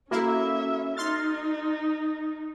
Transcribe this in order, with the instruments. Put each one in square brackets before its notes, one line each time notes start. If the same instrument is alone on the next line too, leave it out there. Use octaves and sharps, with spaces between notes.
[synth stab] A#3 E4 [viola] C#4 E5 [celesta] F#4 A4
[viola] D#4 [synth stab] C6 F6 A6